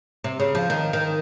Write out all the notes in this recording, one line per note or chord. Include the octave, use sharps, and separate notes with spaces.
C3
C#3
F3
D#3
D#3